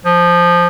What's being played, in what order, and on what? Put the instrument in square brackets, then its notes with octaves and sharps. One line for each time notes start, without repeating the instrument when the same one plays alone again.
[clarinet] F3